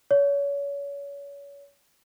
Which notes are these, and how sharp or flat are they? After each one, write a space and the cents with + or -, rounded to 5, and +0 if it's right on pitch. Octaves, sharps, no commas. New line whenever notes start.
C#5 +30